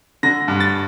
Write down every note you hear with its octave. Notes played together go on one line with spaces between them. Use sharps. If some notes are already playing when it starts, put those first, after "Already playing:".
D3 A#6
G2
A6